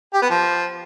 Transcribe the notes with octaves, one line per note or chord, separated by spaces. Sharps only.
G4
B3
F3